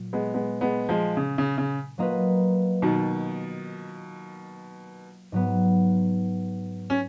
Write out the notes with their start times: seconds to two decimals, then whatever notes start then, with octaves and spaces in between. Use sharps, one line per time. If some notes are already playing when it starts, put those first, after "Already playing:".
Already playing: A#2 F#3
0.13 G#3 B3
0.34 G#3 B3
0.61 G#3 B3
0.89 F3 G#3
1.17 C#3
1.38 C#3
1.58 C#3
1.98 F#3 A#3 F4 B4 D#5
2.82 B2 D#3
5.32 G#2 F#3 B3
6.90 C#4